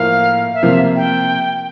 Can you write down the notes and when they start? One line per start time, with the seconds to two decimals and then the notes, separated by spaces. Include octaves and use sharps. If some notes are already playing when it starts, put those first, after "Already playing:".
Already playing: A2 F3 A#3 F5
0.54 E5
0.62 C3 F3 A#3 F5
0.74 E5
0.96 G5